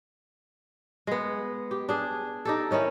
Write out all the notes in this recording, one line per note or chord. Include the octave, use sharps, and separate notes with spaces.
G#3 B3
G4
D4 G#4
D#4 G4 A4
D#3 C#4 D#4 E4